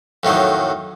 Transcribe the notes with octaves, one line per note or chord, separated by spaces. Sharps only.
F2 A2 D#3 F#3